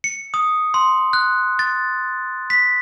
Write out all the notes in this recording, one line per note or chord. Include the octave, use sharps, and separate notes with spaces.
C#7
D#6
C6
F#6
A6
B6